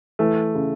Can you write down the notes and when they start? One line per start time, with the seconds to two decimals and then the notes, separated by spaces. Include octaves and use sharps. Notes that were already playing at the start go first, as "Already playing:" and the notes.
0.19 E3 A3
0.55 C#3